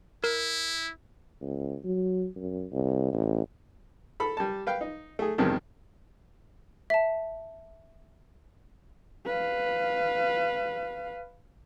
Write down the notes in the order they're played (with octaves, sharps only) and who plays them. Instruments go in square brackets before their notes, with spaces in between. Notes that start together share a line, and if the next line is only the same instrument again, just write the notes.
[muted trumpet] E4 [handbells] A#4
[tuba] C#2
F#3
F#2
C2
A1
[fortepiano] A4 B5
G3 A5
B4 F5 G5
D#4
A3 G#4
E2 G2 C3 D#3 F3
[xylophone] E5 A5
[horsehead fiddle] B4 F5